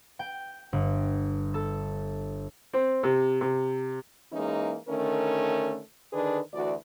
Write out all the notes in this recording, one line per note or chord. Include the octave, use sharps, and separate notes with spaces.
G5
G1
A4
C4
C3
C3
E3 G#3 A#3 C#4 D#4
D3 D#3 A3 C#4 A#4
D3 D#3 D4 G#4 B4
D2 E3 F#4 D5